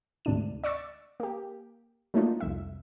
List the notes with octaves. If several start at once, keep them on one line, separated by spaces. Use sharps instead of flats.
D2 G#2 C3 D4 D#7
D5 C#6 D6 E6 A6
A#3 G4
F#3 A3 A#3 D4 D#4 F4
C2 F2 E5